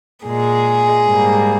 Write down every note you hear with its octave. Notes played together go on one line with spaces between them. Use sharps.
A#2 G#3 G#4
G#2 G3 A#3